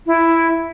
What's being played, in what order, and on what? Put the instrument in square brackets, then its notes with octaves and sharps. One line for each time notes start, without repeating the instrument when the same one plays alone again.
[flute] E4